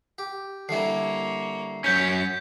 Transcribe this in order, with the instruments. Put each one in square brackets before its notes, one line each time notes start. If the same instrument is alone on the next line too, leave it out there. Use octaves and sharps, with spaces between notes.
[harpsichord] G4
[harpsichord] D3 G3 E4 [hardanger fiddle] A#3 C#5 [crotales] C7
[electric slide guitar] F#2 C#4 [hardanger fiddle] C#5 [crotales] G6 B6